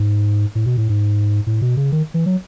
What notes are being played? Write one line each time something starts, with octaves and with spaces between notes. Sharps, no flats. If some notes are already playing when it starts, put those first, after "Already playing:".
Already playing: G#2
A2
B2
A2
G#2
A2
B2
C#3
D#3
E3
F#3